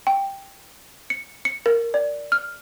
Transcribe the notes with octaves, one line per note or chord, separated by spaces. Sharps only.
G5
C#7
C#7
A#4
D5
F6